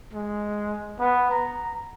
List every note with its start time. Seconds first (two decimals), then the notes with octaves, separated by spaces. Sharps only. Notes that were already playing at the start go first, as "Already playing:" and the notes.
0.13 G#3
0.99 B3
1.31 A#5